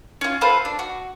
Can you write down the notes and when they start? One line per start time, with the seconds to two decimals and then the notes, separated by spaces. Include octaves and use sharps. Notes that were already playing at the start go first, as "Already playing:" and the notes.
0.21 C#4 F4
0.41 F4 A4 B4 C5
0.65 D4
0.79 F#4